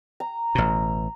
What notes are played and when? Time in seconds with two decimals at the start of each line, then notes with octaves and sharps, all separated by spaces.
0.20 A#5
0.55 A1 B2